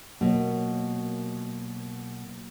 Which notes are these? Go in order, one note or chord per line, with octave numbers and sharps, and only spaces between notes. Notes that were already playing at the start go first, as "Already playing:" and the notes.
B2 F#3 A#3